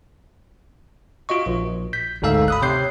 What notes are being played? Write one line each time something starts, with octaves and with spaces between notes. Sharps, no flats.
F4 F#4 D#5 C#6
A#1
G6 B6
G1 D2 G#2 A4 F5 E6
B5 D#6 F#6
C3 C#5 G6 C7